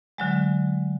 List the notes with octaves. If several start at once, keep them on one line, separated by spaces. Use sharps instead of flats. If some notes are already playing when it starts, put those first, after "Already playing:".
D3 F#3 G#3